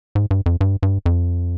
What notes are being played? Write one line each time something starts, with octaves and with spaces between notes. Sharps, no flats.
G#2
G2
F2
G2
G2
F2